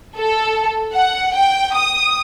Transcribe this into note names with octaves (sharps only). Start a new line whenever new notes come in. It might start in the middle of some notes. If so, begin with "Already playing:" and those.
A4
F#5
G5
D#6